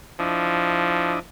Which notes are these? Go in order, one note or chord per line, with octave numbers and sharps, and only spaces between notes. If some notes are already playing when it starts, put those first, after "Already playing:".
F3 D4 E4 D#5